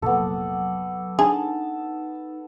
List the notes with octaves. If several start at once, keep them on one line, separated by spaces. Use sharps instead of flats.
F1 A#1 A#2 F#3 B3 A4 D6
D4 D#4 G#4 A5